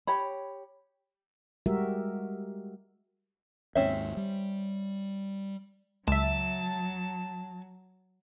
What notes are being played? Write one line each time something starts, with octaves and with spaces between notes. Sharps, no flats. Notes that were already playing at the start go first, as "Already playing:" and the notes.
G4 C#5 B5
G3 G#3 F#4 G4 A#4 E5
D#2 G#2 C4 C#4 E5
G3
C#2 F#3 E5 A5